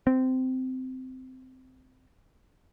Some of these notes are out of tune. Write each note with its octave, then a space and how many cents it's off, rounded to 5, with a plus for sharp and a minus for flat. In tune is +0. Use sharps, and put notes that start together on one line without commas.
C4 -20